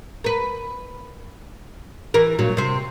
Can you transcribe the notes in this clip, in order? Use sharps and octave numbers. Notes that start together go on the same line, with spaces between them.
A#4 B4
E3 A#4
G2 A#2 F#3
C3 C4